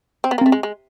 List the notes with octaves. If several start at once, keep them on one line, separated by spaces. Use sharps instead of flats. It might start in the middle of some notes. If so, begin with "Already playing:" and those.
C4
B3
A#3
A3 C4
G#3
G#3